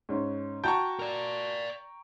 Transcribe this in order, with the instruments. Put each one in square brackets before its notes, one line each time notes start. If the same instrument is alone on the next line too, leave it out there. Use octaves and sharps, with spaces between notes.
[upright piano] G#2 C#4
[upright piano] F#4 A5 G6 [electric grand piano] G5 A#5 C#6
[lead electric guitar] A#4 D5